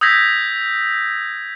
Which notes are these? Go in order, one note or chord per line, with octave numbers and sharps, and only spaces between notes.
D#6 E6 G6 G#6 A#6 B6